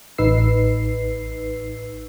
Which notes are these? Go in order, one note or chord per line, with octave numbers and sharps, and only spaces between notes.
A1 D#4 B4 E6 C7